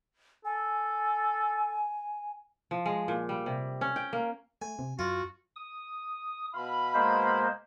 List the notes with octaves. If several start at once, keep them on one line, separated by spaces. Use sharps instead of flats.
A4 G#5
F3
G#3
A#2
G3
C3
C#4
G5
A#3
A3 G#5
C3
F#2 F4 F#4
D#6
B2 F5 B5
G#3 A#3 C5